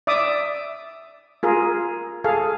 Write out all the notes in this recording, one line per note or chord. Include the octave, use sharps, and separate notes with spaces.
D5 E5 D6 D#6
F4 G#4 A#4
G#4 A4 F5